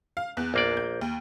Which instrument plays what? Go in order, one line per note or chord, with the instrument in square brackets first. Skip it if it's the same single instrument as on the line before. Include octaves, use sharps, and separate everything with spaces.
[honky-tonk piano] F5
E2 F#6
[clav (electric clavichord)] A#1 A#3 D5
[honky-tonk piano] G6
D#2